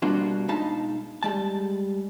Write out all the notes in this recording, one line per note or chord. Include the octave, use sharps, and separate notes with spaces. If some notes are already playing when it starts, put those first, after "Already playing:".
B2 G3 A#3 D4 F4 F#4
B2 G#3 D#4 F5 A5 B5
G3 G#3 A5